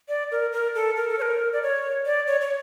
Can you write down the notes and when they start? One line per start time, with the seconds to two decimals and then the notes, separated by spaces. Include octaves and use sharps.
0.08 D5
0.31 A#4
0.52 A#4
0.75 A4
0.96 A#4
1.09 A4
1.18 C#5
1.22 A#4
1.53 D5
1.62 C#5
2.05 D5
2.27 C#5
2.41 C#5